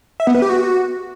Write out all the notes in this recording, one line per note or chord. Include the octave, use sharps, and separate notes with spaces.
E5
B3
B4
G4
F#4